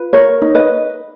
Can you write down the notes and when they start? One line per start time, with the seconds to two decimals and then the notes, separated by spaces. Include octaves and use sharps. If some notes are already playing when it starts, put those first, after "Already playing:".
Already playing: F4 B4
0.13 A#4 C#5
0.42 D#4
0.55 B4 D#5